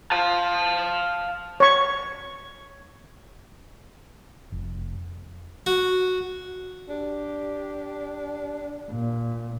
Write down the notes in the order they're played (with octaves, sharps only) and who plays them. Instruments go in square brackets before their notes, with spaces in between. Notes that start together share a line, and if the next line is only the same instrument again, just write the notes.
[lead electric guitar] F5 A5
[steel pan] C#5 C#6
[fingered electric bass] F1
[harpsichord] F#4
[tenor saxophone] D4 [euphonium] G4
[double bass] A#2